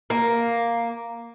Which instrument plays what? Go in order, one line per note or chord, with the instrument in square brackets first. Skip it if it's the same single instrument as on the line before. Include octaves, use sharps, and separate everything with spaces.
[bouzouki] A#3